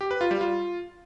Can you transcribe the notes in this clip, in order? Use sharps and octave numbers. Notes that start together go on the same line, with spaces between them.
G4
B4
F4
G3
F4